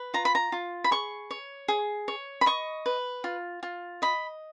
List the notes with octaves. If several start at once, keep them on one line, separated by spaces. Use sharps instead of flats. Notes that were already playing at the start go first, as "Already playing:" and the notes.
Already playing: B4
F4 A#5
B5
A#5
F4
B5
G#4 C#6
C#5
G#4
C#5
B5
D#5 C#6
B4
F4
F4
D#5 B5